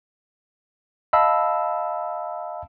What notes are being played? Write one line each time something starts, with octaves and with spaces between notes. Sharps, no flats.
D#5 F5 A5 B5 E6